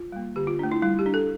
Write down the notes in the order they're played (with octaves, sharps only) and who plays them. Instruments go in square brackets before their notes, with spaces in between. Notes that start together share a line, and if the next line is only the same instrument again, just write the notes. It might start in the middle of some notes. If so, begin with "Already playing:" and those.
Already playing: [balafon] F4
G3 A#3
D3 G4
F4
A3 D4
E4
G3 E4
G4
D4
A4